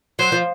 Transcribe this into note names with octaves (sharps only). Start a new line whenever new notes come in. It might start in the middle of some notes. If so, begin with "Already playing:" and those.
F#3 C5
F3